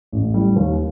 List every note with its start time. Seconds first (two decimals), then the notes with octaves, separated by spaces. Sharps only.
0.12 A1
0.34 A2 G3
0.56 D#2